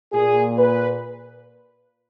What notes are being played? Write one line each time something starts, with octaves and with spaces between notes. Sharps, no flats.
A#2 G#4
B4